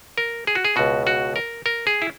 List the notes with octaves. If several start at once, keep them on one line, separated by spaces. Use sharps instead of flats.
A#4
G#4
F#4
G#4
C#2 B2 F#4
F#4
A#4
A#4
G#4
E4